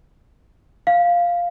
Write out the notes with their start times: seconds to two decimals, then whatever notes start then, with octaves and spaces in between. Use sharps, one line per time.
0.87 F5